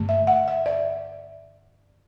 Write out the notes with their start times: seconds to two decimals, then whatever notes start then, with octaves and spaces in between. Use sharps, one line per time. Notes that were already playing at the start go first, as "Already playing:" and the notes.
Already playing: G2 D3 A3
0.09 E5
0.27 F#5
0.48 E5
0.66 D5